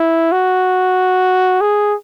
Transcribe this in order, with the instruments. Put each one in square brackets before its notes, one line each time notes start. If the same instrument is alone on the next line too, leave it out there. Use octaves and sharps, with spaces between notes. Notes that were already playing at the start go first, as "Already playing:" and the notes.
Already playing: [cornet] E4
F#4
G#4